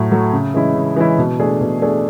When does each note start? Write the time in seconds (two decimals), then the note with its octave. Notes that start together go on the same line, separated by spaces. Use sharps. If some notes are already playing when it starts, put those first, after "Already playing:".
Already playing: A2 F#3 A3
0.11 F#3 A3
0.33 C#3
0.54 E3 G#3 C#4 E4
0.75 C#3
0.96 E3 G#3 C#4 E4
1.18 B2
1.40 A3 D4 G#4
1.61 B2
1.82 A3 D4 G#4